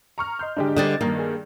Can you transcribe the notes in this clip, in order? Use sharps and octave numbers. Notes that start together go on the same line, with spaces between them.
A#5 C#6 F6
D#5 C6 F6 G6
G#2 D3 G#3 D4 G4
D3 G3 C4 D#5 A6
G2 D#3 A#3
G#4 A#4